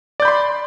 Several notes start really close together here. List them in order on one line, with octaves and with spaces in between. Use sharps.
D5 G6 B5 C6